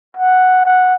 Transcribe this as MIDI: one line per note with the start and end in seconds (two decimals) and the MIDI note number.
0.17 0.64 78
0.65 0.95 78